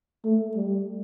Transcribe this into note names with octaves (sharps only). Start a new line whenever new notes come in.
A3
G3